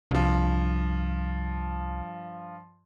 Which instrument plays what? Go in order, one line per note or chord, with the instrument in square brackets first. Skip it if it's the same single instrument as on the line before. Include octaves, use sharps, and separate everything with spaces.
[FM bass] C2 [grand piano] G2 F3